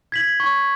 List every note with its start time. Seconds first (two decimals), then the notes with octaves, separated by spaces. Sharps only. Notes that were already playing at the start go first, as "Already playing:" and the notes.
0.12 G#6 B6 F#7
0.40 C#6